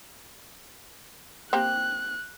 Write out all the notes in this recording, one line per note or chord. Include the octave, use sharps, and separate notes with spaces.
A#3 C4 G4 F#6